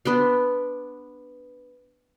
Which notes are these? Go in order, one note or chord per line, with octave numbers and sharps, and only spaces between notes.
B3 D4 C6